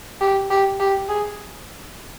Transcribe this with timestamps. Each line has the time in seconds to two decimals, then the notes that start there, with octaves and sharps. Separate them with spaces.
0.21 G4
0.50 G4
0.80 G4
1.09 G#4